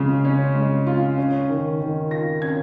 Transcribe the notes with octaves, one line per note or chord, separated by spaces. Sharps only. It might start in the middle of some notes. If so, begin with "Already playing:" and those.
Already playing: C#3 G#3 F4
C#4
G#3
F4
C#4
D#3
D#3
F4 A#6
C#4 G#6